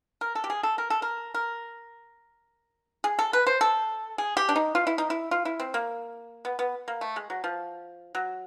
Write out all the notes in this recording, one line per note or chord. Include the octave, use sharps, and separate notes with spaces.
A#4
A4
G4
G#4
A4
A#4
A4
A#4
A#4
G#4
A4
B4
C5
A4
G#4
G4
D4
D#4
F4
E4
D#4
E4
F4
E4
C4
A#3
B3
B3
A#3
A3
G#3
F#3
F3
F#3